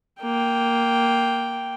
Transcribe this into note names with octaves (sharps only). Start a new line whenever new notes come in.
A#3 G5